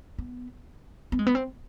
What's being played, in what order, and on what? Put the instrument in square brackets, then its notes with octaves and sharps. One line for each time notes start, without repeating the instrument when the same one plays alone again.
[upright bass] B3
B3
G#3
B3
C4